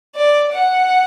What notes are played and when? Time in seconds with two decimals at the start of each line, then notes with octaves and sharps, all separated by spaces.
0.15 D5
0.52 F#5